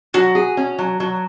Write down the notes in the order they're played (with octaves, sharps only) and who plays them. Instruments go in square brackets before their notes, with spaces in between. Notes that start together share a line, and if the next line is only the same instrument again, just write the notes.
[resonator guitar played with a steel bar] F#3 [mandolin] F#4
[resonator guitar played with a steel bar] G#4
C#4
F#3
F#3